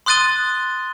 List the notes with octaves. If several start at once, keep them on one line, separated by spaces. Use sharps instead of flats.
C6 D#6 F#6 A6 D#7 G7